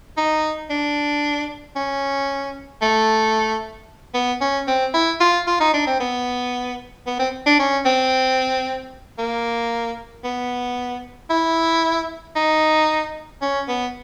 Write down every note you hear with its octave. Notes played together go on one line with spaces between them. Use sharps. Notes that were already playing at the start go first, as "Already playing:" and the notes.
D#4
D4
C#4
A3
B3
C#4
C4
E4
F4
F4
D#4
D4
C4
B3
B3
C4
D4
C#4
C4
A#3
B3
E4
D#4
C#4
B3